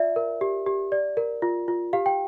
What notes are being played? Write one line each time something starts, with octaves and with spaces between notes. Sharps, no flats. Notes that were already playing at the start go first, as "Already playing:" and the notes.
Already playing: F4 D5 E5
A#4
G4
G4
D5
A#4
F4
F4
G4 F5
G5